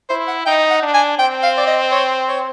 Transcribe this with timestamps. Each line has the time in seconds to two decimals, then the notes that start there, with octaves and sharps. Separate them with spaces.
0.10 E4 C5
0.28 F#5
0.46 D#4 G5
0.70 F#5
0.82 D4
0.94 G#5
1.19 C4 G5
1.43 F5
1.58 D5
1.67 D#5
1.92 C#5
2.28 C#5